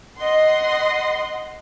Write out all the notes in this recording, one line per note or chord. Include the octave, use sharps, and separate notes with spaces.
D#5 F#5 C6